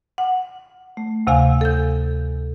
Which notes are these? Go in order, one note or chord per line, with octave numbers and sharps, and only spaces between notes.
F#5
A3
D2 C3 F5 G#5
A4 G6